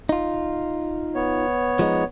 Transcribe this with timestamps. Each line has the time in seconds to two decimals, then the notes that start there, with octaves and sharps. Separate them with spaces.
0.09 D#4 F4
1.15 B3 C#5
1.79 F3 G#3 D#4